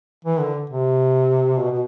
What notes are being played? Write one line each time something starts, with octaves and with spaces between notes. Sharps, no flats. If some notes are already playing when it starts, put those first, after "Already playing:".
E3
D3
C3
B2
B2